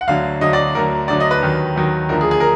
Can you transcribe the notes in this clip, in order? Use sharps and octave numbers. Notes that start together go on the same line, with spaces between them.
F#5
D2 D3 F#3 F5
D2 D3 F#3 D#5
D5
D2 D3 F#3 A#4
D2 D3 F#3 D5
D#5
B4
D#2 D#3 F#3
D#2 D#3 F#3
D2 D3 F3 A#4
G#4
G#4
A#4